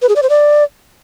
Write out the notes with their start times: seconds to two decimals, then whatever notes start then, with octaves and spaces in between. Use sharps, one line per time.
0.02 B4
0.09 G#4
0.16 D5
0.23 C5
0.30 D5